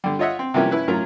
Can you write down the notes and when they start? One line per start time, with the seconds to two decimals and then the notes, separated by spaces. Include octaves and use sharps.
0.04 D3 G3
0.19 F4 C#5 D#5 E5 F#5
0.39 C4
0.54 C3 E3 F3 G3 A#3 C#4
0.71 C#4 E4 B4
0.88 A2 F#3 C#4 F4 A#4 A#5